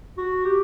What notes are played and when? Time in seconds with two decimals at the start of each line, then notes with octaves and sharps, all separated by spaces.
0.18 F#4
0.45 G4